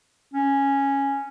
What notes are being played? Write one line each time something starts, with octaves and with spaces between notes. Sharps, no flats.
C#4